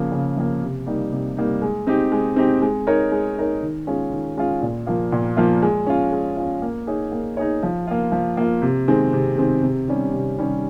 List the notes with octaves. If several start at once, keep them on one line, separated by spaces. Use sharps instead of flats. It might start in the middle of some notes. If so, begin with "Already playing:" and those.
Already playing: C#3 F3 A#3
C#3
F3 A#3
C3
G3 A#3 D#4
C3
G3 A#3 D#4
G#3
C4 D#4 G4
G#3
C4 D#4 G4
G#3
D#4 A#4 C#5
G#3
D#4 A#4 C#5
D#3
G#3 C#4 F4
D#3
G#3 C#4 F4
A#2
F3 A#3 F4
A#2
F3 A#3 F4
G#3
C#4 F4
G#3
C#4 F4
A#3
D#4 G#4 C#5
A#3
D#4 G#4 C#5
F3
A#3 F4
F3
A#3 F4
C3
D#3 G#3 C4
C3
D#3 G#3 C4
C3
D#3 G3 C#4
C3
D#3 G3 C#4